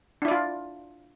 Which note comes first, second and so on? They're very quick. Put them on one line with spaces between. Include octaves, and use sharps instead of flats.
D4 E4 D5 F4